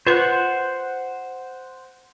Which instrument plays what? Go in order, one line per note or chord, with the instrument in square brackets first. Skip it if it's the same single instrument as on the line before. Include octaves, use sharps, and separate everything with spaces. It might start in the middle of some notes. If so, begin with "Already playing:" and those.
[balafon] F4 B4 C6 [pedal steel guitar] C5 F#5